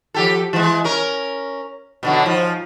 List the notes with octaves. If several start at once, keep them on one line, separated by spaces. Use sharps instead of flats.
F3 G4 A4
E3 G#3
C#4 A#4
B2 D3 F#3
G#2 F3